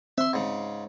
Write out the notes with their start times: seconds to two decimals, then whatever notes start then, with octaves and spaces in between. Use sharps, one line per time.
0.18 C4 E5 C6
0.33 G#2 C#3